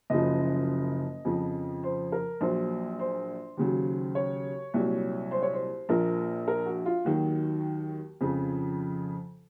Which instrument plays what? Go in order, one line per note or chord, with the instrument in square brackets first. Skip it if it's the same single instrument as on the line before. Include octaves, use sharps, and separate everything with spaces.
[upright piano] F#1 F#2 C#3 F3 D#5
F2 C#3 F3
C5
A#4
A#1 A#2 F#3 C5
C5
D#2 C#3 F#3
C#5
C2 A#2 F#3
C5
C#5
C5
A#1 A#2 F3 A#4
A#4
F#4
F4
D#2 D#3 F#3 F#4
F2 C#3 F3